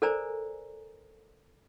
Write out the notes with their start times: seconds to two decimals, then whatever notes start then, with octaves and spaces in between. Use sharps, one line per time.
0.02 A4 A#4 C5 D5 G#5 A#5